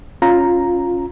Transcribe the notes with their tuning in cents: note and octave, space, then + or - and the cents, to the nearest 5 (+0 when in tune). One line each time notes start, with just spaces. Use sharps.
C#4 +0 F4 +10 A#5 +0